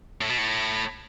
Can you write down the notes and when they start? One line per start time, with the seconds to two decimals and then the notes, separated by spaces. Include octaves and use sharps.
0.21 A2
0.29 B2
0.38 A2